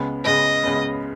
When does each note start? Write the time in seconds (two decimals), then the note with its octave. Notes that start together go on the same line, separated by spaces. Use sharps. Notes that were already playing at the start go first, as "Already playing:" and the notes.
Already playing: C#2 C#3 G#3 B3
0.25 C#2 C#3 G#3 B3 D#5
0.63 C#2 C#3 G#3 B3